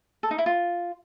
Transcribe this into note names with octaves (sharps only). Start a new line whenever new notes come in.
A4
D#4
E4
F4